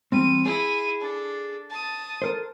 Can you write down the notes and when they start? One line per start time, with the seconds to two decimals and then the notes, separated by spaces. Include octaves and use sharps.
0.12 E2 G3 C4 D#7
0.46 E4 G#4 D#7
1.00 D4 A4
1.70 A5 D#6
2.22 A4 A#4 C5